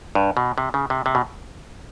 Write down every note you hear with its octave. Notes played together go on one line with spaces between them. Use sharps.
G2
B2
C3
C#3
C3
C3
B2